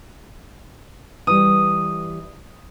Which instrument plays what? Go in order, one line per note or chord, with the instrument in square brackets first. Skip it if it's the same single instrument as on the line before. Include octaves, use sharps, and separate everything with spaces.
[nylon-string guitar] E3 G3 [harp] D#6